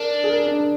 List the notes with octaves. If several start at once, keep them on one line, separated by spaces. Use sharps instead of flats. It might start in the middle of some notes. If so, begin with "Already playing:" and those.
Already playing: D4 A#4
G#4
A#4
D4